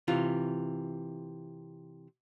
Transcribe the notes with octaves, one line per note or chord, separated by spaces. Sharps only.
C3 E3 F4